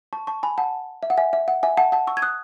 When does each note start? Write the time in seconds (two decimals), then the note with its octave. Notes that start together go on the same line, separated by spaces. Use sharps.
0.13 A5 C#6
0.27 A5 C#6
0.43 G#5 B5
0.58 F#5 A5
1.03 E5
1.10 F#5
1.17 E5 G#5
1.33 E5
1.48 F#5
1.63 E5 G#5
1.77 F#5 A5
1.92 F#5 A5
2.07 C#6 E6
2.17 G#6
2.22 D#6 F#6